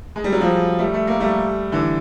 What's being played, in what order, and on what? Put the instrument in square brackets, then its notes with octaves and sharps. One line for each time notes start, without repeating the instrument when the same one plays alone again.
[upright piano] G#3
G3
F#3
F3 G3
G3 A3
A3
A#3
G3 A3
D3 E3